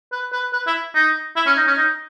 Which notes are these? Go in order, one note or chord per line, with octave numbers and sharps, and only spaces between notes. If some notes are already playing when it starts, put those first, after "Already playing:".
B4
B4
B4
E4
D#4
E4
C#4
D#4
C#4
D#4